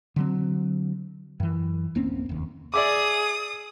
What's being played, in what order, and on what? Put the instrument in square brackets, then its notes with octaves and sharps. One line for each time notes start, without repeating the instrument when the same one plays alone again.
[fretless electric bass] D3 F#3 C4
F#2 E3
D1 A#3 C4 C#4
F1 D#2
[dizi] G#4 [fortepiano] D5 E5 D6 [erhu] D#6